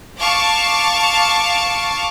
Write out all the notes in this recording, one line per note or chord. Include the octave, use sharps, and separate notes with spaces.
F5 A5 C#6 D6